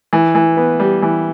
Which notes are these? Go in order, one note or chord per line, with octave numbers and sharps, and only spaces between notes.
E3
E3
B3
G3
E3